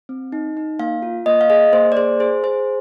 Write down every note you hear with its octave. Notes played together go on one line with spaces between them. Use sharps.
C4
D#4
D#4
A#3 F5
F4
A#3 D#5
F5
G#4 D#5
A#3 C5
D5
G#4 C5
G#4 C5
G#4 C5